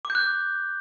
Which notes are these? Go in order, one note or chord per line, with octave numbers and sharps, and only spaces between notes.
D6
G6
F#6